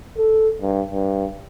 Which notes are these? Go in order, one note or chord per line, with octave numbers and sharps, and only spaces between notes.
A4
G2
G2